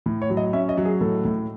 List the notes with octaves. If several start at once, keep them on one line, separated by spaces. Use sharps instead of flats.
A2
C#5
F#3
D#5
C#4 E5
D#5
F#3
G#4
A2 A4
A2